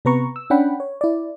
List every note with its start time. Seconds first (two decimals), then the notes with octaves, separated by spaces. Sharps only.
0.05 C3 B3 B4 A#5 C#6
0.36 E6
0.50 C#4 D4 F#5 G5 B5
0.80 C#5
1.01 E4 D5